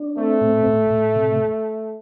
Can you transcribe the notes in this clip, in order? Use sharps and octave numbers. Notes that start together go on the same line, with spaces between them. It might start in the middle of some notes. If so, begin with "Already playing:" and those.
Already playing: D4
A3 C4
A2
A2
A2
C3